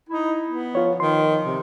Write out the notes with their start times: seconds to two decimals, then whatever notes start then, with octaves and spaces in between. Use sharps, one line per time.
0.09 D#4 E4
0.48 B3
0.75 F3 F4 C#5
1.00 D#3 C6
1.45 C3